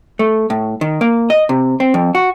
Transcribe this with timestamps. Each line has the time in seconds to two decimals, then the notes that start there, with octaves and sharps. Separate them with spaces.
0.19 A3
0.50 A2
0.81 D#3
1.01 A#3
1.30 D#5
1.49 C3
1.80 C4
1.94 F2
2.15 F#4